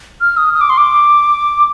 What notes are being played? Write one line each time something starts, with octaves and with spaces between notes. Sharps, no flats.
F6
D#6
D#6
D6
C6
D6